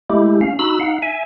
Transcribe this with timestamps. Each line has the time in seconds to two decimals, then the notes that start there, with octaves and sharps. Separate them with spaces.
0.10 G#3 A3 E4 G4
0.41 C#4 F5
0.59 D#4 F#4 B5 E6
0.80 D#4 F5 F#5
1.02 E5 G#5